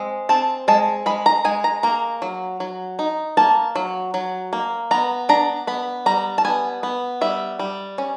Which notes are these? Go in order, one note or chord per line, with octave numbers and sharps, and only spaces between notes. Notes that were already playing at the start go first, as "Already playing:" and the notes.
Already playing: G#3 C4
C4 A5
G#3 A5
G#3 B5
A#5
G#3 G#5
A#5
A#3 A#5
F#3
F#3
D#4
A#3 A5
F#3
F#3
A#3
B3 A#5
D4 A#5
B3 B5
G3 A#5
A5
B3 G#5
B3
G3 E5
G3
C#4